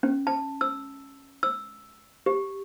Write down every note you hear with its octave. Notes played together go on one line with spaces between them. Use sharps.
C#4
A5
E6
E6
G4